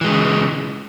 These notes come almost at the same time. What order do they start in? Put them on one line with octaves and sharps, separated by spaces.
E3 G#3 C#3